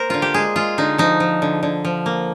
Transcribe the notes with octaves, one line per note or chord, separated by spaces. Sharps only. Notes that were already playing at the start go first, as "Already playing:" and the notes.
Already playing: A#3 A#4 C5
D3 F4
G4
G#3 G#4
G#3 F4
D3 D#4
F3 D#4
F3
D3
D3
F3
A#3